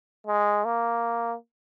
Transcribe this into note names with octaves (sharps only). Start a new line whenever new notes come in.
G#3
A#3